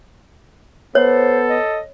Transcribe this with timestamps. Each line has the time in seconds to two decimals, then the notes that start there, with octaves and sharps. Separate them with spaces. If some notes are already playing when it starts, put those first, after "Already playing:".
0.95 B3 A4 C5 C#5
1.49 D#5